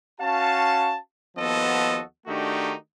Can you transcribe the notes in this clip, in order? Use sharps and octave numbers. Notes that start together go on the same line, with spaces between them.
C#4 F#4 F5 A5
D#2 F3 B3 F#4 A4 D#5
D#3 A3 D4 D#4 F#4 G4